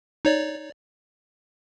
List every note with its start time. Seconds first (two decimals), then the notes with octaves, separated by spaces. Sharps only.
0.25 D#4 C#5 D5